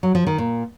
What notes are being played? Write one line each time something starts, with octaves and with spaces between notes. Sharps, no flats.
F#3
F3
D#3
A#2